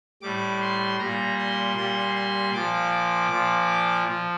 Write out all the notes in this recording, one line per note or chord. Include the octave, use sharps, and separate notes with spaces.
A2 G3 D6
C6
A#2 G3 A#5
C6
A#2 G3 C6
C6
A#2 F3 D6
D6
A#2 F3
F3